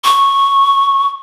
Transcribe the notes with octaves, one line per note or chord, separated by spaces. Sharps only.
C#6